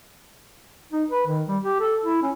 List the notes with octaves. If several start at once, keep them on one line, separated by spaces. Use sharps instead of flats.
D#4
B4
D#3
G3
G4
A4
E4
C#4